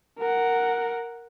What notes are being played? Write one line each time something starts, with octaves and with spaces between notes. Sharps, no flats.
A#4 F#5